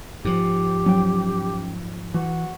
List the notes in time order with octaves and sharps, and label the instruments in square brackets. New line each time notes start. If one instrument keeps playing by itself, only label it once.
[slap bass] G#2 F3 [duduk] G4
[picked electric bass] F#3 [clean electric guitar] C#4 G5
[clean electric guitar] E3 [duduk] F#4